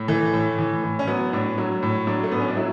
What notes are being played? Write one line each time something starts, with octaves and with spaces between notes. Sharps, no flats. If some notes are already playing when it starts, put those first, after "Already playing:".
Already playing: A2
E3 A3
A2
E3
A2
C#4
F#3 B3
A2 D4
F#3
A2
F#3 D4
A3
A2 B3
C#4
D4
F#3 E4